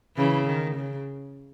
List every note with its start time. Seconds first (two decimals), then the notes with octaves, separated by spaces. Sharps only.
0.16 C#3 E3
0.46 D#3
0.76 C#3